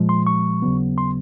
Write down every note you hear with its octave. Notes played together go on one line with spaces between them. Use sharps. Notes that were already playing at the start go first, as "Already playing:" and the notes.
Already playing: A#2 F3 G#3
C6
C#6
D#2 C#3 F#3 B3
C6